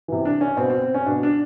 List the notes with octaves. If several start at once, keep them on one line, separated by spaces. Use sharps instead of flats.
C3 E3
D4
C#4
B2 C4
C4
C4
C#4
B2 D4
D4